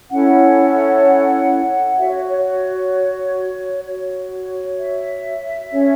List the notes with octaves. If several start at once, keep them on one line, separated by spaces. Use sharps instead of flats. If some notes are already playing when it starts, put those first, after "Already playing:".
C#4 E4 A4 C#5 F#5
F#4 C#5 E5
C#5
C#5
F#4 C#5
E5
C#4 A4 C#5